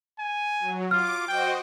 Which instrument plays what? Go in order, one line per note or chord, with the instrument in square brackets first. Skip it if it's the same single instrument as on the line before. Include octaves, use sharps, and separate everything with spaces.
[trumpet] G#5
[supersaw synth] F#3
[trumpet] F4 [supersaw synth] D6 [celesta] F6
[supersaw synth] F#4 C5 D#5 [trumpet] G5